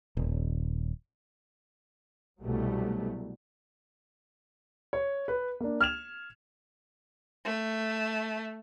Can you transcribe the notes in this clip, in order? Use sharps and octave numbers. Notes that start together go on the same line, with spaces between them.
D#1
C2 B2 F#3 G3 A3
C#5
B4
A#3 D4
F6 G#6 E7 F7
A3